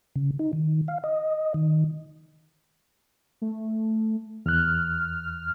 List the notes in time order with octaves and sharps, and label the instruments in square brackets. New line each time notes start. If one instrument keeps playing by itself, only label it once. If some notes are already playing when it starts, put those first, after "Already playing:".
[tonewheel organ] C#3
D#4
D#3
F5
D#5
D#3
[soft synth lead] A3
[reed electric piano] E2 F#6 [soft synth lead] F6